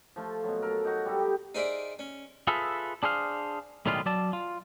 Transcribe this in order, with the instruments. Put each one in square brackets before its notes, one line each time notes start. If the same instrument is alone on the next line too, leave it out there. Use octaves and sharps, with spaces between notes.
[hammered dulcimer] F3 A3 F4
B2 F#3
A4 A#4
D#4 F#4
G3 A4
G4
[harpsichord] D#4 G#4 A#4 C5 D5 E5
C#4
[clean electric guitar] F4 G#4 A4 B4 E5
D4 G#4 C5 F5
B1 A2 D#3 G3 G#3 F4
F#3 D5 A5
F4